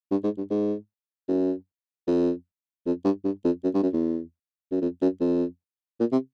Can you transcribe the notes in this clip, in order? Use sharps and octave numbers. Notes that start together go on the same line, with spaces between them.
G2
G#2
G2
G#2
F#2
F2
F2
G2
G2
F2
F#2
G2
F#2
E2
F#2
F2
F#2
F2
A#2
C3